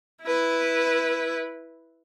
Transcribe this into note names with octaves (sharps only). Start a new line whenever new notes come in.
E4 B4